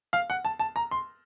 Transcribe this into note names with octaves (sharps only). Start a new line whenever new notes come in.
F5
F#5
A5
A5
A#5
C6